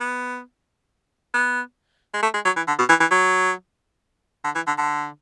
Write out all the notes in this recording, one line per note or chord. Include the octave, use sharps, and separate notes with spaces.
B3
B3
G#3
A3
G#3
F#3
E3
D3
B2
E3
E3
F#3
D3
E3
D3
D3